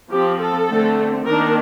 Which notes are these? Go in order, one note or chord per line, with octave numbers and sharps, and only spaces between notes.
F3 C4 G4
A4
D3 A3 C4
D#3 A#3 D4 A#4